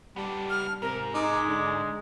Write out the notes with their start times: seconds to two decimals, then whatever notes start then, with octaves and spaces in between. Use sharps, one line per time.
0.16 G3 B3 D4
0.50 F6
0.82 G#2 C3 A#4
1.14 G#3 D#4 D6
1.48 D3